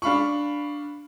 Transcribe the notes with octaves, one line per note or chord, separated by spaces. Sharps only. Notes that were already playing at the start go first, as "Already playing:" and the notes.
D4 F5 B5 C#6